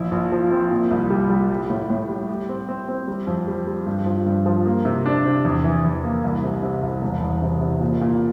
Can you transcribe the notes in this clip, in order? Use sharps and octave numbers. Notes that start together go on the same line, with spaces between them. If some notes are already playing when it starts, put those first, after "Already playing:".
Already playing: A#1 E4
A#1
F3
C4
A#2
C2
G3
G3
G3
A2
A2
G3
G4
C4
C4
C4
G3
F2
G3
G3
G2
F3
G2
F3
A#3
C3
D4
C3
E2
E3
E2
A#3
C2
C3
C3
C2
E1
E2
C3
C3
A#2
A#2